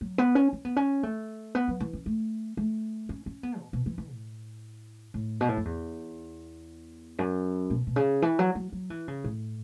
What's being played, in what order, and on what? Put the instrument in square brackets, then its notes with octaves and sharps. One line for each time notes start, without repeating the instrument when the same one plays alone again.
[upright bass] F#3
B3
C#4
C#4
B3
C#4
A3
B3
F#3
E3
C#4
A3
A3
C#4
C#4
B3
B2
B2
E3
E3
A2
A2
B2
A2
F#2
E2
F#2
B2
B2
C#3
E3
F#3
F#3
F#3
E3
C#3
A2